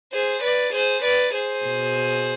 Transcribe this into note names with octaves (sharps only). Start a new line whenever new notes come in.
G#4 C5
B4 D5
G#4 C5
B4 D5
G#4 C5
B2